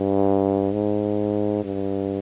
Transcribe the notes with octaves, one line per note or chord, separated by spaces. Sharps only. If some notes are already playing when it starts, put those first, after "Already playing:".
Already playing: G2
G#2
G2